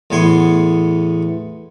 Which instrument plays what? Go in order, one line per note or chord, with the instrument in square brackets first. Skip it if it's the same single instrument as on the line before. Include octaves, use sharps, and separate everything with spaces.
[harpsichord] E2 A2 B3 G#5 C6 C#6